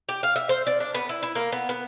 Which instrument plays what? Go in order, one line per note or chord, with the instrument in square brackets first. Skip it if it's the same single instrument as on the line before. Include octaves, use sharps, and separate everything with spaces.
[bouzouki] G4
F5
E5
C5
D5
D4
B3
E4
E4
A#3
B3
B3